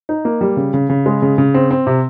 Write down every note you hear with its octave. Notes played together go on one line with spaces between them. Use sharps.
D#4
A#3
G3
C#3
C#3
C#3
G#3
C#3
C#3
C4
C4
C3